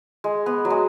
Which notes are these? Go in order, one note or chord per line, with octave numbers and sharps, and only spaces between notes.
G#3
B3
F#3
G#3